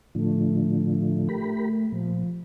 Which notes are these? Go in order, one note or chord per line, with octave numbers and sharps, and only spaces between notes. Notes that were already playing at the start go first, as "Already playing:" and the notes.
A2 D3 F3 A3
G4 A#4 B5
A#2 F3